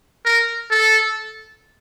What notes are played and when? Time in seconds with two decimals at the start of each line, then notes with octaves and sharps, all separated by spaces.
0.25 A#4
0.71 A4